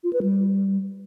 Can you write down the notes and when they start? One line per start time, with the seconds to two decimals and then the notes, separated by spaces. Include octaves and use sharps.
0.04 F4
0.13 B4
0.23 G3